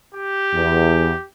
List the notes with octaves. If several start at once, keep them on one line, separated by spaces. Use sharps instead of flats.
G4
E2